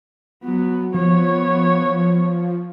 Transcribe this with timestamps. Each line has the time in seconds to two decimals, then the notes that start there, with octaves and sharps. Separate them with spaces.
0.43 F#3 B3
0.94 F3 B3 C#5